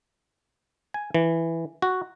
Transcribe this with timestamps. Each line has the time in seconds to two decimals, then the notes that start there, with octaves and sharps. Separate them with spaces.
0.94 G#5
1.14 E3
1.82 F#4